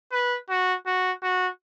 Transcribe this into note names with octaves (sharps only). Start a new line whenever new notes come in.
B4
F#4
F#4
F#4